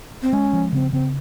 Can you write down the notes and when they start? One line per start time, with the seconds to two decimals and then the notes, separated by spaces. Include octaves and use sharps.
0.22 C4
0.33 G#3 C#4
0.53 F3
0.73 C#3 C4
0.92 C#3 C4